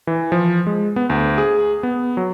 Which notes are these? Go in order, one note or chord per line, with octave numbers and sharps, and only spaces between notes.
E3
F3
G#3
B3
D2
G#4
B3
F#3